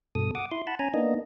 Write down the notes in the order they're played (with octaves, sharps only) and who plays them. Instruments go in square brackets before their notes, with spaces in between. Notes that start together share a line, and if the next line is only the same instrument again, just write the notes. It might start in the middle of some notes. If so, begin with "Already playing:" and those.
[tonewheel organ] G2 B2 A4 D#6
F#5 D6 D#6
E4 C6
F#5 A5 B5
C#4 G#5 A#5
A#3 B3 D4 D#4 D#5